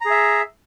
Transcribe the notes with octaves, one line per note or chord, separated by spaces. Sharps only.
G#4 E5 A#5